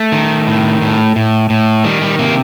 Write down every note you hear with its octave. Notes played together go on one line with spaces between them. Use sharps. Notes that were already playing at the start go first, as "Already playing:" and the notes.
Already playing: A3
D#3
A2
A2
A2
A2
D#3 G3
G3
C3 A#3